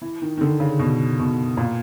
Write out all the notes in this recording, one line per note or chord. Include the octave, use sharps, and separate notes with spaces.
E3
D#3
D#3
D3
C#3
B2
B2
A#2